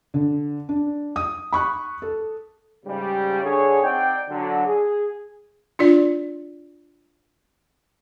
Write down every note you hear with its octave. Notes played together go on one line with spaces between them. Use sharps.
D3
D4
D#6
B5 C#6 F#6
A4
G#2 C#3 G3
D3 G#4 C#5
C4 D#4 D5 F#5 G5
D3 F#3
G#4
D4 F4 D5